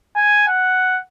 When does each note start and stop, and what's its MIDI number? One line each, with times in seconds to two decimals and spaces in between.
0.16 0.47 80
0.48 1.00 78